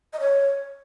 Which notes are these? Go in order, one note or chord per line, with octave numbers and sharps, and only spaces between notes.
D#5
C#5